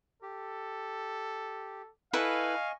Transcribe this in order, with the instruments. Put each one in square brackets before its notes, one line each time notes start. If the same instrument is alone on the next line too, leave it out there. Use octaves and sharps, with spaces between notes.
[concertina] G4 [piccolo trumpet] A4
[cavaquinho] E4 A4 B4 [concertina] D#5 G#5 C#6 [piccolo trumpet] F5